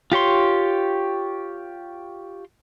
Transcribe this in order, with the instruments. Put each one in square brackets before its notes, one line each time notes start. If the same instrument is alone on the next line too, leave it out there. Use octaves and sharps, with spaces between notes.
[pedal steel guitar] F4 G4 C#5 C6